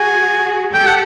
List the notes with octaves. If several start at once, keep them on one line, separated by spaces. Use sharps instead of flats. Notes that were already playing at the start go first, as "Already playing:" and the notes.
Already playing: F#4 G#4 G#5
G4 A4 G5
F#5